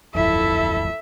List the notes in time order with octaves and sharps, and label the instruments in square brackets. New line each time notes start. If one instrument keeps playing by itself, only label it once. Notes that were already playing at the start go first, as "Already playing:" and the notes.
[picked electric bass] D1 G1 F2 [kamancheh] E4 A4 [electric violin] E5